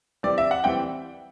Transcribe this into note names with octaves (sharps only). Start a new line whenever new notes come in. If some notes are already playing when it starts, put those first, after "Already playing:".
E3 G3 C4 D5
E5
F#5
E3 G3 C4 G5